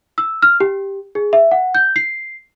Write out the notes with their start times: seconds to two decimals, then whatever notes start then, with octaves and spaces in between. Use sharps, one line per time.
0.18 E6
0.42 F6
0.60 G4
1.15 G#4
1.33 E5
1.51 F#5
1.75 G6
1.96 C7